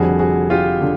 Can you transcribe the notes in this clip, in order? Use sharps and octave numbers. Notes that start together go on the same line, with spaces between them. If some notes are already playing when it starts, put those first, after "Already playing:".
Already playing: F1 F2 D3 G3 F#4 G#4
F#4 G#4
F4 G4
D3